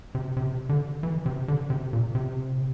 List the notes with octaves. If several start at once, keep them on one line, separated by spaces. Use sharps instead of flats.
C3
C3
D3
E3
C3
D3
C3
A#2
C3